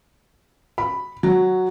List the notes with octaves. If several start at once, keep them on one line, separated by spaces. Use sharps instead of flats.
B5
F#3